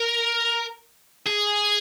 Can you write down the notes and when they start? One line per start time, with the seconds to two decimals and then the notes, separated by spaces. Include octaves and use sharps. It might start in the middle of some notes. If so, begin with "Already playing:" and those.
Already playing: A#4
1.27 G#4